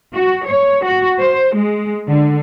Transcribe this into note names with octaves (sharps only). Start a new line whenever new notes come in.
F#4
C#5
F#4
C5
G#3
D3